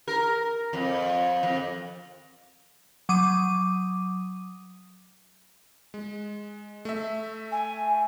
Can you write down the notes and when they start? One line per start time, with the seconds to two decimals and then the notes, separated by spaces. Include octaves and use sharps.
0.08 A#4
0.73 F2
1.43 F2
3.09 F#3 D6 D#6 D#7
5.94 G#3
6.85 A3 E5
7.51 G#5